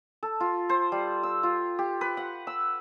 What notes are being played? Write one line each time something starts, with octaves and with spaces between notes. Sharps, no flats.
A4
F4
C5
G3
E6
F4
G4
B4
F#5
E6